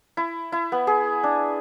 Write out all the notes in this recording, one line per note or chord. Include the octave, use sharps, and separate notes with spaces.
E4
E4
B3
G#4
D4